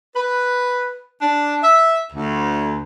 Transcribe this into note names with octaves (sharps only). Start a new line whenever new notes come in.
B4
D4
E5
D2